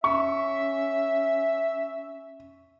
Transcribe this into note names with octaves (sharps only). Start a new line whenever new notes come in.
C#4 E5 C#6